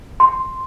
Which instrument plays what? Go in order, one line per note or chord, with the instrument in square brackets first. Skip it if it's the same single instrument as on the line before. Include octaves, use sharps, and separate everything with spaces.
[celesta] C6